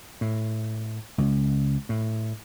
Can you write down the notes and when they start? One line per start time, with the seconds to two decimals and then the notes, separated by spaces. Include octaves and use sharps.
0.21 A2
1.18 C#2
1.89 A2